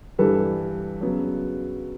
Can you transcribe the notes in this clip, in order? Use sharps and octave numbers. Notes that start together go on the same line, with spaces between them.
G2 E3 G3 A4 B4
C#3 F#3 B3